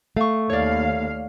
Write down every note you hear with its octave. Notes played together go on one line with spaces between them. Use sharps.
A3 F5 C#6
D#2 C#5 D5 F5